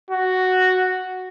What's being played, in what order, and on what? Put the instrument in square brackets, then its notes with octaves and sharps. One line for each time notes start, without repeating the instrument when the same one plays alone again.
[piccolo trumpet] F#4